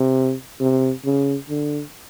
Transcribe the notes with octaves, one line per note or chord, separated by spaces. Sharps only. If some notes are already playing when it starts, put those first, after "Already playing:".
Already playing: C3
C3
C#3
D3